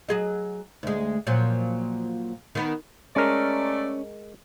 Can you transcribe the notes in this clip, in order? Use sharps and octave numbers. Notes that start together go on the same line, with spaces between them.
F#3 G#4 D#5
D2 G#3
A#2 F3 F#3
D#3 B3
G#3 A3 C#4 A#4 D5